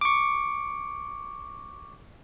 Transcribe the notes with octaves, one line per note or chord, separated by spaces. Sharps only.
C#6 D6